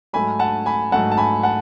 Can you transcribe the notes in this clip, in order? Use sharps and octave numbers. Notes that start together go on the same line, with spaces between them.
G#2 F#3 A3 G#5 B5
F#5 A5
G#5 B5
G#2 F#3 A3 F#5 A5
A5
G#5 B5
F#5 A5